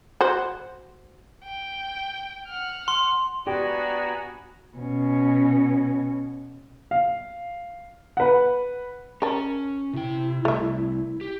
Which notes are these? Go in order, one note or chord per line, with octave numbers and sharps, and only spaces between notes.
F#4 C5
G5
F#5 F6
C6
B3 D4 F#4 G4 G#5 A#5
B2 C#4
F5
B4 F#5
C#4 A#4 A5
C3 E4 G5
C2 A3 E5
G4